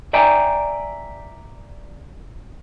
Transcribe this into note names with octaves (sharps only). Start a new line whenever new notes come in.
D5 E5 G5 G#5 A#5